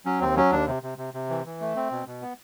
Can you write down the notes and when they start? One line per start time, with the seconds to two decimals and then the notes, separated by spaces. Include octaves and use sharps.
0.06 F#3 C#4
0.21 D#2 C4
0.36 F#3 C#4
0.52 D#2 D4
0.67 C3
0.83 C3
0.98 C3
1.14 C3
1.30 E3
1.45 E3
1.61 A3
1.76 C4
1.91 B2
2.07 B2
2.22 B3